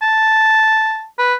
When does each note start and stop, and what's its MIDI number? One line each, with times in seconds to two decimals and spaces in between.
0.02 1.05 81
1.19 1.34 71